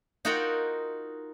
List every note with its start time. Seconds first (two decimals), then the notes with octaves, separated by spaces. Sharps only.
0.25 D#4 F4 F#4 A#4 F#5 G5